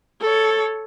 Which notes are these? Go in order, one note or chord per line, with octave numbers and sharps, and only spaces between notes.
A4 C#5